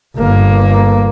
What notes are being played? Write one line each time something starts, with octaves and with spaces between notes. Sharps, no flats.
G1 A#3